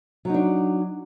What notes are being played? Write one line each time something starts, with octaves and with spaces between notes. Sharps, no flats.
F#3 D4 D#4